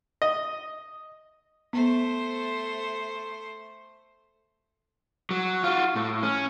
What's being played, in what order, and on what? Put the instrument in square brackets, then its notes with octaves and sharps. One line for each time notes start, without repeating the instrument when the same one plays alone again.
[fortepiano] D#5
[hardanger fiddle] A3 C5 [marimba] B3
[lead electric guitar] F#3
F4 F#4
A2
C#4